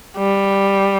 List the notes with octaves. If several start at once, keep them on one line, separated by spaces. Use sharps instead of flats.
G3